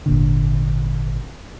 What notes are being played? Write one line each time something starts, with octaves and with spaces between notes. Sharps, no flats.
G#1 A#2 D3